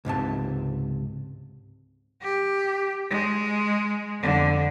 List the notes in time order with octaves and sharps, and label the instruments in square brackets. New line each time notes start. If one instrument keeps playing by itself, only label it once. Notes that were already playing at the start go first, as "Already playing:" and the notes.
[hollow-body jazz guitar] C#2 G#2 C3 A5
[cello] G4
G#3
F2 D3